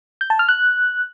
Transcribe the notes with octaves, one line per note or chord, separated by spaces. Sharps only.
G6
A5
F6
F#6